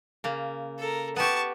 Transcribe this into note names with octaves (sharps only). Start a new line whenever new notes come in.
C#3 A#3
A4 A#4
B3 G4 A5 C#6